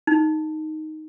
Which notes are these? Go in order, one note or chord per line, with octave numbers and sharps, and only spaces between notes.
D#4